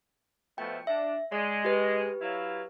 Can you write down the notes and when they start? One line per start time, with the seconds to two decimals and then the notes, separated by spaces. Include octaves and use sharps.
0.58 B2 F3 A3 G5
0.87 D4 E5
1.32 G#3 D5
1.65 G4 B4
2.21 F#3 E4 F5